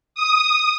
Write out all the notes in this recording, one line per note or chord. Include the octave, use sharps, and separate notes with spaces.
D#6